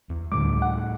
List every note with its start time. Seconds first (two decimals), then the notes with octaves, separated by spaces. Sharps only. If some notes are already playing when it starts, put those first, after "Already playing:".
0.09 E2
0.32 D2 A2 G3 D6
0.62 F#5